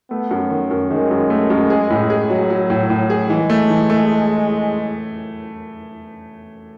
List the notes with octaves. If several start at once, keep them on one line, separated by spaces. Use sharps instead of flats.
A3 B3
F#2
D#3
F#2
D#3 G#3
F#2
A3
F#2
G#4
A2
G#4
F#3
F#3
A2
A2
G#4
E3 G#3
A3
E3
A3